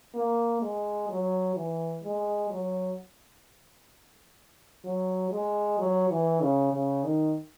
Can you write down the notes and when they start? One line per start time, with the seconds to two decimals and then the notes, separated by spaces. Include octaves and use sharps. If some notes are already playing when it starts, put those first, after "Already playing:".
0.15 A#3
0.62 G#3
1.09 F#3
1.56 E3
2.03 G#3
2.50 F#3
4.85 F#3
5.32 G#3
5.79 F#3
6.11 E3
6.41 C#3
6.73 C#3
7.04 D#3